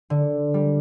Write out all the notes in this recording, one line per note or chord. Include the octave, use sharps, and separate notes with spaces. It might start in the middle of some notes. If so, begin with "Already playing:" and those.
D3
G3